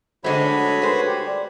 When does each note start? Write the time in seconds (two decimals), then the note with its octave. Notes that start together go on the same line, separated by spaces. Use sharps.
0.24 D3 G#3 A3 C4 F#4 C#5 B5
0.45 F#3
0.82 B3 G#4 C5
1.07 G4
1.26 G3